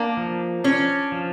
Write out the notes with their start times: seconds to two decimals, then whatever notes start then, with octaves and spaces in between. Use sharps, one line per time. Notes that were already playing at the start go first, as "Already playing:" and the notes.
Already playing: A#3 D4
0.17 F3
0.64 C#4 D4
1.12 F3